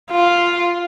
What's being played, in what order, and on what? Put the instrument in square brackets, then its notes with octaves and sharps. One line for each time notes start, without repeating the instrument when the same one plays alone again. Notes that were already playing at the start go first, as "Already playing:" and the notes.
[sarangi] F4